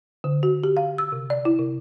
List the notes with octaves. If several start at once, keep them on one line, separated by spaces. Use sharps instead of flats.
D3
F#4
G4
F5
E6
C3
D5
E4
C3